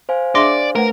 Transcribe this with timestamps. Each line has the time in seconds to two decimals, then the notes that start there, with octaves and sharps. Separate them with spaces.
0.09 C5 F5 G#5
0.35 D4 G#4 D5 E5 C6 D6 A#6
0.75 A3 A#4 B4 F#5